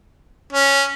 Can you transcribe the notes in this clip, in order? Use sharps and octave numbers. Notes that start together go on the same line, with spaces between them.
C#4